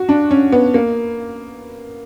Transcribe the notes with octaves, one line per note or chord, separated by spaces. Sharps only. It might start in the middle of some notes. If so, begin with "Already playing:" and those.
Already playing: F#4
D4
C#4
B3
A#3